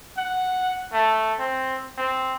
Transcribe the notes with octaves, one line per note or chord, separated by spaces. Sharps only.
F#5
A3
C4
C4